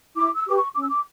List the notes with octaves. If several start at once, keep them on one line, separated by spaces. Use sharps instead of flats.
E4 D6
E6
G4 B4 D6
C#6
C#4 D6
E6
D6